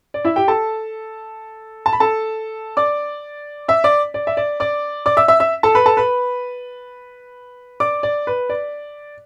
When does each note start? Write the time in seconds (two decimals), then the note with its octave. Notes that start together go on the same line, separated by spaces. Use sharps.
0.14 D5
0.25 E4 E5
0.36 G4 G5
0.48 A4 A5
1.86 A5
1.93 B5
2.00 A4 A5
2.77 D5 D6
3.68 E5 E6
3.84 D5 D6
4.14 D5
4.27 E5
4.37 D5
4.60 D5 D6
5.06 D5 D6
5.17 E5 E6
5.28 E5 E6
5.40 E5 E6
5.63 A4 A5
5.75 B4 B5
5.86 A4 A5
5.97 B4 B5
7.80 D5 D6
8.03 D5
8.27 B4
8.50 D5